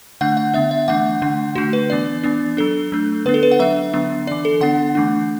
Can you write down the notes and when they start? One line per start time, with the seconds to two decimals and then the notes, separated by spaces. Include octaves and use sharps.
0.21 D3 A3 D4 F#5
0.37 F#5
0.54 D3 B3 D4 E5
0.71 E5
0.88 E3 A3 D4 F#5
1.22 D3 A3 D4
1.55 D3 A3 D4 F#4
1.73 B4
1.90 E3 B3 D4 D5
2.23 E3 B3 D4
2.57 F#3 D4 A4
2.92 F#3 A3 D4
3.26 D3 B3 D4 B4
3.34 A4
3.43 B4
3.52 F#5
3.59 F#3 D4 E5
3.93 D3 F#3 B3 D4
4.27 E3 D4 D5
4.45 A4
4.61 D3 B3 D4 F#5
4.95 E3 A3 D4